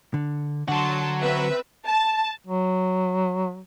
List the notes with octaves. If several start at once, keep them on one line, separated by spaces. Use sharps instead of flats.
D3
D3 F#3 F#4 A5 C6
C4 B4 E5
A5
F#3